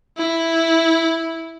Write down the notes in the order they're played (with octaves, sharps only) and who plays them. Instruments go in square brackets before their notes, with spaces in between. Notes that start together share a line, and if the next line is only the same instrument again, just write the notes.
[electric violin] E4